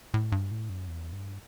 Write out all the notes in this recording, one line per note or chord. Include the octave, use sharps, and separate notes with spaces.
A2
G2
A2
F#2
E2
G2